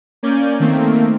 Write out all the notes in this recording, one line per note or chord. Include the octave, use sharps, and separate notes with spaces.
A#3 C#4 D5 G#5 G6
D#3 A3 A#3 C4